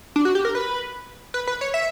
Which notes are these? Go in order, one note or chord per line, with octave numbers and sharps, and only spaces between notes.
D4
F#4
G4
A#4
B4
B4
B4
C#5
E5